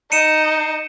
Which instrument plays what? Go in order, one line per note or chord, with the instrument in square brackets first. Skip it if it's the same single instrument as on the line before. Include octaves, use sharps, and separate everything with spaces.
[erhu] D#4 [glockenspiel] C#7 D#7 E7